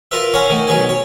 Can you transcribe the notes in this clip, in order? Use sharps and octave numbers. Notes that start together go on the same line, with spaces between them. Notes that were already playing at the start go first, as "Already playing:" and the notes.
F4 A#4 B4 E5
C#4 C#5 F5 F#5 A#5
D#3 A3
B1 F#3 G#4 B4 G#5
C#5